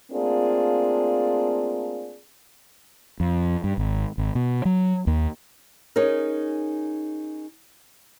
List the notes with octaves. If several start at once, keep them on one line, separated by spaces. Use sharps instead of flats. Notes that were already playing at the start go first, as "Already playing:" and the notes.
A3 A#3 C4 D4 F4 G#4
F2
G2
G#1
G#1
B2
F#3
D#2
C#4 D#4 G#4 A#4